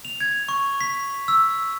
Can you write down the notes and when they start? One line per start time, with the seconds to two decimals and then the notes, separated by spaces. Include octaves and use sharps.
0.05 F7
0.20 G#6
0.49 C#6
0.81 B6
1.28 E6